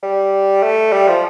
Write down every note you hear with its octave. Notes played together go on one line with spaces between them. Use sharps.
G3
A3
G3
F3